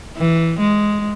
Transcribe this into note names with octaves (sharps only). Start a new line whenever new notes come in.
E3
G#3